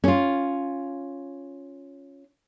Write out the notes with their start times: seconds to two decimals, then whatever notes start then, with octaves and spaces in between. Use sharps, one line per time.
0.04 C#4 F4